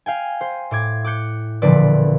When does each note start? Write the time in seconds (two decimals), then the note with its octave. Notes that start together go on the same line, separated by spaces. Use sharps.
0.06 F5 G5 G#5
0.41 C5
0.71 A2 D6 G#6
1.04 D6 F#6 G6 C#7
1.62 E1 A#2 D3 F3 B4 D5